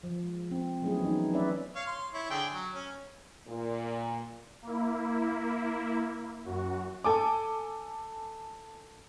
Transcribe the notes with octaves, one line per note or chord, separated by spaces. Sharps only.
F3
G#3
C4
F#3 A3 B3 C#4 E4 G#4
E3 B3 D#4
F#3 C#4 B4 D5 E5
C#5 F5
C6
E4 C#5
D3 G#4 G5
F#3
C#4
A#2
A#3 E4
F#2 F#4
A4 G#5 D6